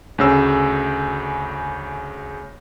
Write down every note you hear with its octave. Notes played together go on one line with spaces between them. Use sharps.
D2 C#3 E6